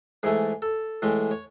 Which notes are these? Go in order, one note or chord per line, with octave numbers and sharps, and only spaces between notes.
G#2 E3 A3 G#4
A4
A2 E3 G#3
C#5